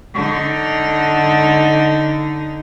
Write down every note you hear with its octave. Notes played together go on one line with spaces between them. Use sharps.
D3 D#4